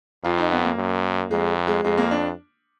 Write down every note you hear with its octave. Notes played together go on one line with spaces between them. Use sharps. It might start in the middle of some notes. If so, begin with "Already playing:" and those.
F2 F4
D#4
B3
A#3
F#2
F2 G#3
G#3
F2 G#3
A#3
D4